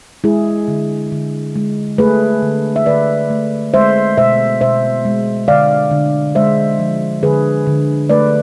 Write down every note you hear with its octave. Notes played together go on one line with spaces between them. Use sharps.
G#3 E4 G#4
D3
D3
G#3
A3 G#4 B4
D3
E5
D3 B4 D5
A3
G#3 C5 E5
B2 C5 E5
B2 C5 E5
G#3
D3 D5 F5
D3
G#3 C5 E5
F3
D3 G#4 B4
D3
A3 B4 D5